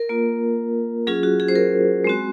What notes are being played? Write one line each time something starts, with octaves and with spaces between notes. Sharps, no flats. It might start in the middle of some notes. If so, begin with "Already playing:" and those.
Already playing: A#4
A#3 F4
F#3 C#4 F4 G#4
F#4
G#4
C5
A#4
G#3 C4 F#4